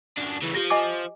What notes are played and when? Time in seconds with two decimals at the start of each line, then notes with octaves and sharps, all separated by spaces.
0.18 F#2 D4
0.42 C#3 E3
0.55 F3 G4 A#6
0.70 D#5 G#5 D6